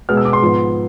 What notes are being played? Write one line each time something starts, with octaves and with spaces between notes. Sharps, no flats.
B2 G#3 B3 F6
E6
D6
C6
G#2 F3 B3